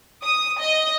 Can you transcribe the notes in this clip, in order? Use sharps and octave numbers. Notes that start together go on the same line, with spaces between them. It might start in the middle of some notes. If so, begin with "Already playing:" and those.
D#6
D#5